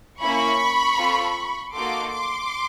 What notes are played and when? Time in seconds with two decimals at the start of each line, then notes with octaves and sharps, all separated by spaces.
0.21 A#3 C#4 E4 B5 C#6
0.98 C4 F4 A4
1.74 A#3 D#4 F#4 A4 C6 D6
2.13 C6 D6